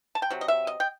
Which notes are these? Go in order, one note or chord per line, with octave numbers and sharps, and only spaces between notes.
A5
G5
C3 F#3
D#5
E5
D#5
G5